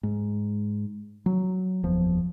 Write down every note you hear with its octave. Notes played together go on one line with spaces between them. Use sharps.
G#2
F#3
F#1 E2 F3